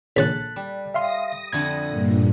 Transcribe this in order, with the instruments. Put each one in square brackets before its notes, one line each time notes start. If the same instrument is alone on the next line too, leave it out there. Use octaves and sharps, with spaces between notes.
[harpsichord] A#1 C#3 [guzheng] A4 [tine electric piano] F#6 A6 B6
[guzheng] G3
[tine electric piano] E5 F5 C6 [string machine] D#6 A#6
[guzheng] F2 D3 E4 [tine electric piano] G#6
[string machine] G2 A#2